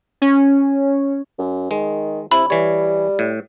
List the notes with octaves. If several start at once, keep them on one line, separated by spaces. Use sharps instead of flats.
C#4
F#2
D#3 G#3
C3 E4 B5
E3 G3 C#5
A2